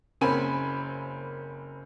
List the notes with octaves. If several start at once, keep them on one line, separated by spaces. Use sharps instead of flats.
F#1 A#3 C4 C#4 G#5 B5